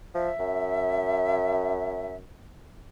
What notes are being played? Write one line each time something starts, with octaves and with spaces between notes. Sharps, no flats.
F3 E5
F#2